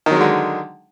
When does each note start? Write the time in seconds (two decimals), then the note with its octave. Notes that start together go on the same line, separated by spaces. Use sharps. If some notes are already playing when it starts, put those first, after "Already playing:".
0.06 D#3
0.11 F#3
0.16 G#3
0.21 D3